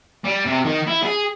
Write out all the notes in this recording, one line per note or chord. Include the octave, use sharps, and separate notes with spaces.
G3
C3
D#3
E4
G#4